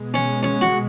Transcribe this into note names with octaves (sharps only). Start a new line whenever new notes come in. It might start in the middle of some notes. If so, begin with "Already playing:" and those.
Already playing: B2 G#3 B3
C#4
C#4
F#4